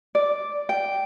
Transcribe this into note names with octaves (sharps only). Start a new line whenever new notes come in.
D5
G5